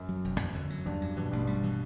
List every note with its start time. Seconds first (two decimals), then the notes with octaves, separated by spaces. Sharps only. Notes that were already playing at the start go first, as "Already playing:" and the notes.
Already playing: F#2
0.09 F#3
0.24 E1
0.40 E2
0.55 D3
0.70 F#3
0.86 E2 G2
1.02 F#3
1.17 G2 B2 E3
1.31 A1 G2 B2
1.47 G3
1.63 E3